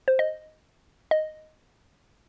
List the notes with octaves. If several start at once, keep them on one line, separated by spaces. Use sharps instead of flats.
C5
D#5
D#5